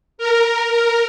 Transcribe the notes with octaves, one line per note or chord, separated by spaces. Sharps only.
A#4
A#4